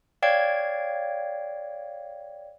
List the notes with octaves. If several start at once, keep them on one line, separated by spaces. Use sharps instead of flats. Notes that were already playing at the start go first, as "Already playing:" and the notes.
C#5 D5 F5 G5 G#6